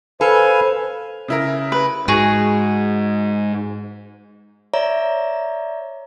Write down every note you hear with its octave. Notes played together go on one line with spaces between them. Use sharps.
A4 B4 C5 F5 G#5
C#3 E4 A#4
B4
G#2 F#4 G#4
C#5 D5 E5 A#5